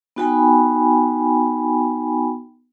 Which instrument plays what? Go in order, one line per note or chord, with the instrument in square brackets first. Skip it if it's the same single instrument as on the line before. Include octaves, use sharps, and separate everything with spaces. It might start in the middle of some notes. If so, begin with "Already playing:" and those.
[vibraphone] B3 D#4 F#4 G5 G#5 B5